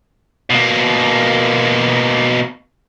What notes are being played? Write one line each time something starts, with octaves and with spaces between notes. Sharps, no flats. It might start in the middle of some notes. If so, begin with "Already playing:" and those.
B2 A#3